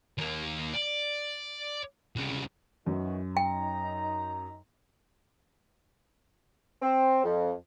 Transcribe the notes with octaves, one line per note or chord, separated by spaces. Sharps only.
D#2 A#3
D5
C2 C#3
F#2 D#3 E3 F#4
D#4 G5 A#5
C4
F2